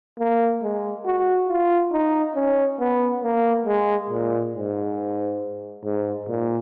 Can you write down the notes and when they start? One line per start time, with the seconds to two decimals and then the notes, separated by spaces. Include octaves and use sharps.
0.19 A#3
0.63 G#3
1.05 F#4
1.49 F4
1.93 D#4
2.35 C#4
2.80 B3
3.23 A#3
3.66 G#3
4.10 A#2
4.54 G#2
5.84 G#2
6.28 A#2